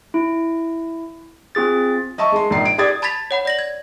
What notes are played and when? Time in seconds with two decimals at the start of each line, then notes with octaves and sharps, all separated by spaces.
0.14 E4
1.55 C4 F4 G#4 A6
2.18 D#5 E5 A5 C#6
2.32 G#3 C6
2.50 A#1 G#2 C7
2.65 D7
2.78 G4 D5 D#6 G#6 A6
3.02 A5 B5 G#6 A6 B6 F7
3.31 C#5 F#5 B5
3.45 D5 A#6 F#7
3.59 G#6